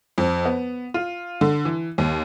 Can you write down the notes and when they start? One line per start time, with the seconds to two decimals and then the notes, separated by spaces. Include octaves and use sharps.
0.18 F2
0.45 B3
0.94 F4
1.41 D3
1.65 E3
1.98 D#2